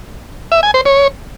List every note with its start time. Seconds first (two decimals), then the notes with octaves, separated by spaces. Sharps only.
0.52 E5
0.63 G#5
0.74 C5
0.85 C#5